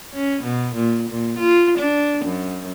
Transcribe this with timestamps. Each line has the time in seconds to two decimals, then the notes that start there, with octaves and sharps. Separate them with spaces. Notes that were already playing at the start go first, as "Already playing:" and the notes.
0.13 C#4
0.43 B2
0.74 A#2
1.09 A#2
1.38 F4
1.78 D4
2.24 F#2